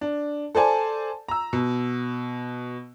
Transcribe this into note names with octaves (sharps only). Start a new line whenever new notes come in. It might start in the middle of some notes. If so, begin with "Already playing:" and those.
D4
A4 C5 D5 G#5 A5
A#5 E6
B2